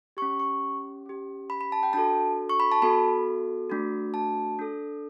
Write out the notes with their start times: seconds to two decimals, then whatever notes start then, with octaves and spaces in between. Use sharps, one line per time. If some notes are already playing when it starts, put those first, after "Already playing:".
0.17 G4 C#6
0.22 C#4
0.40 C#6
1.06 C#4 G4
1.50 B5
1.61 B5
1.72 A5
1.83 G5
1.93 D4 F#4 A4 A5
2.49 C#6
2.60 B5
2.72 A5
2.82 B3 F#4 A4 B5
3.70 A3 D4 F#4
4.14 A5
4.59 D4 A4